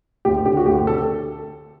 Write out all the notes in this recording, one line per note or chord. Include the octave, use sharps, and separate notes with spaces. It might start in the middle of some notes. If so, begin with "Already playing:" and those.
D2 G4
D3 G4
F#4
D2 G4
D3 A4